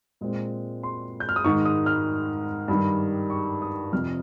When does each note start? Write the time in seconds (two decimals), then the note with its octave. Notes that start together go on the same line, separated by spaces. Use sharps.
0.21 A#2 G#3 C4
0.83 C6
1.20 G6
1.29 F6
1.36 D#6
1.44 G#2 D#3 G#3 C#6
1.65 D#6
1.86 F6
2.68 G2 D#3 G3
3.30 C#6
3.62 D#6
3.93 F2 C3 F3 F6